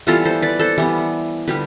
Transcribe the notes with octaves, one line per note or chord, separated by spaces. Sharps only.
E3 G3 B3 F4 A4
A4 C5
B4 D5
A4 C5
E3 G3 B3
D3 G3 G4 B4